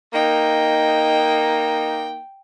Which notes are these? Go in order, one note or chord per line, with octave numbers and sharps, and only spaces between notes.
A#3 D#4 G5